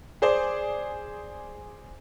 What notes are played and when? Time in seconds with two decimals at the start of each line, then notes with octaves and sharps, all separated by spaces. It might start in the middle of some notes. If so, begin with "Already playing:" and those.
0.22 G#4 C5 D5